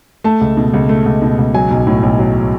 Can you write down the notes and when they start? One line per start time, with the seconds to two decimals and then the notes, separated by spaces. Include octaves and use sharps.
0.24 A3 A5
0.41 C#2
0.57 B2
0.74 C#2
0.89 A3
1.06 C#2
1.22 B2
1.39 C#2
1.54 F#3 G#5
1.71 B1
1.87 A2
2.03 B1
2.19 F#3